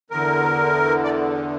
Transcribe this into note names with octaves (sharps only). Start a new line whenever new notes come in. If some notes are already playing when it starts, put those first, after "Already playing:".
E2 D3 A#4
D5